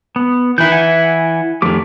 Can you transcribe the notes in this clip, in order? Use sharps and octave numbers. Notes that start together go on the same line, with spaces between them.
B3
D#3 E3 E4 G6
F#5 G#5
F2 D#3 A3 G4 D6